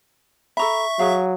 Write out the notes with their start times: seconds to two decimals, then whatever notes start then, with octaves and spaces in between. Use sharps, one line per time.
0.57 A4 E5 A#5 B5 C#6
0.99 F#3 G#4 F5